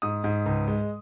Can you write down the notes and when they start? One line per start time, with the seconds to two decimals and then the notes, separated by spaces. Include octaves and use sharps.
0.02 G#2 D#6
0.24 G#2
0.46 C#2
0.68 G#3